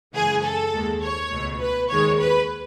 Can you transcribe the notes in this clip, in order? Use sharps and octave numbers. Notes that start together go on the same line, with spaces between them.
F#2 C#3 E3 G#3 G#4
A4
D#2 D#3 G#3
C#5
C#2 B2 A3
B4
D#2 D#3 G#3 C#5
B4